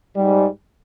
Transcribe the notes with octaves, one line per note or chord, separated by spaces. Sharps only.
G#2 G3